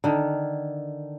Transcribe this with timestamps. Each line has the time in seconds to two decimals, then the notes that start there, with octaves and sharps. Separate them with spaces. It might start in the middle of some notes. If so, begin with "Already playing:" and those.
0.04 D3 D#3